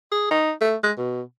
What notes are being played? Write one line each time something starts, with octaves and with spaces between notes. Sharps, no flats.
G#4
D#4
A3
G#3
B2